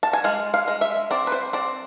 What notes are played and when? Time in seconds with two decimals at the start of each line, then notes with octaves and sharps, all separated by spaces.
0.03 A5
0.13 G#5
0.24 G#3 F5
0.54 F5
0.68 G#3
0.81 E5
1.11 C4 D5
1.27 B4
1.32 C5
1.53 C4 D5